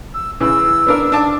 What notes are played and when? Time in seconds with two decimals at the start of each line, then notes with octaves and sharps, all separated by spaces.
0.14 E6
0.40 C#3 E3 E6
0.87 B3 D4 A#4
1.12 D4 A5 D6